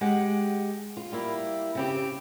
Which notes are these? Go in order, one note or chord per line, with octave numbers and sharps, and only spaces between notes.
G#3 G4 G#4 F#5
F4
G3 A#3 E4
C#3 C4 G4